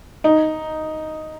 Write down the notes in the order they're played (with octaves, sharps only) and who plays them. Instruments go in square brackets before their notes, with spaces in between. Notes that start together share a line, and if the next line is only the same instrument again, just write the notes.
[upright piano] D#4